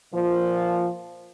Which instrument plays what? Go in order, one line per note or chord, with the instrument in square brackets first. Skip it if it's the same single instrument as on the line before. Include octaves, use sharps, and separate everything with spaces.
[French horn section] A#2 F3